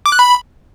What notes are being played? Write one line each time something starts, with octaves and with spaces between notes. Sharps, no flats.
D6
F#6
B5